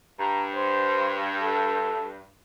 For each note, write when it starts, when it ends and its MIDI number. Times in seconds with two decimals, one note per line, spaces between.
0.19 2.32 43
0.19 0.44 82
0.55 1.20 72
1.42 2.09 69